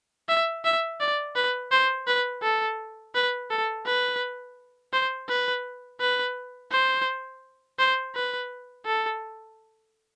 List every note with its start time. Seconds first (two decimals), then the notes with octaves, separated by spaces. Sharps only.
0.29 E5
0.65 E5
1.00 D5
1.36 B4
1.71 C5
2.07 B4
2.43 A4
3.15 B4
3.50 A4
3.86 B4
4.93 C5
5.29 B4
6.00 B4
6.72 C5
7.79 C5
8.15 B4
8.86 A4